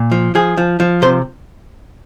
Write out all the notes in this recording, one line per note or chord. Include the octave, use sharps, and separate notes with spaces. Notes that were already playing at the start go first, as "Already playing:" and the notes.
Already playing: A#2
F3
F3 G#4
F3
F3
C3 C5